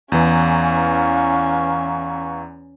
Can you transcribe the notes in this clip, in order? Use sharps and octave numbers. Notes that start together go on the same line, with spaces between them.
E2 E3 C#4 F5 A#5 C#6